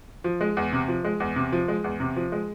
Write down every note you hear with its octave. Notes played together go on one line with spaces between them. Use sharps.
F3
G#3
E2
C3
F3
G#3
E2
C3
F3
G#3
E2
C3
F3
G#3